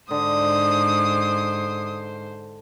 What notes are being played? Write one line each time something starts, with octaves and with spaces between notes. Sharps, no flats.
G#2 D3 C5 D#6